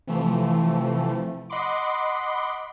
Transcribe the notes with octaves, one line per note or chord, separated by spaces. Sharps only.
C3 E3 F3 A3
D#5 F#5 B5 C6 D6